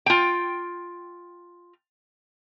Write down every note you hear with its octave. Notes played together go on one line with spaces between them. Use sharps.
F4 G5